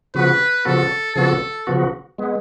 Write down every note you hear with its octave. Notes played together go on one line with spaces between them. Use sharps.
C#3 F3 B3 F#4 B4
C#3 F3 B3 F#4 A4
C#3 F3 B3 F#4 A4
C#3 F3 B3 F#4
G#3 B3